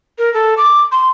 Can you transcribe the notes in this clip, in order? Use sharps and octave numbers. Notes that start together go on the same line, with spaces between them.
A#4
A4
D6
C6